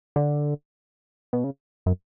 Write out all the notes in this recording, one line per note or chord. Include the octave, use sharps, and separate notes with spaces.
D3
B2
C#3
F#2